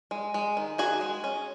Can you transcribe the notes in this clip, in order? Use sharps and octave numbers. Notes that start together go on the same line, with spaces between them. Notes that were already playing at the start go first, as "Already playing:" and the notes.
G#3
G#3
D#3
D#3 F#4 G#4
G#3
C#4